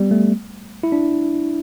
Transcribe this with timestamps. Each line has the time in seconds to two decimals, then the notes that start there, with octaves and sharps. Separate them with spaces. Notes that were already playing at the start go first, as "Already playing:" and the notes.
Already playing: G3 B3
0.11 A3
0.83 E4
0.92 D4